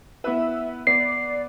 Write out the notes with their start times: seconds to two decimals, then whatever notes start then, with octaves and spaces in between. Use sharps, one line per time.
0.24 B3 E4 B4 E5
0.87 B3 D5 C7